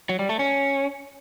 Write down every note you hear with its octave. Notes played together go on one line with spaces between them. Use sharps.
F#3
G3
A3
C#4